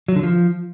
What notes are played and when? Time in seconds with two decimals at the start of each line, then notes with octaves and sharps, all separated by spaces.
0.08 F#3
0.16 D3
0.23 F3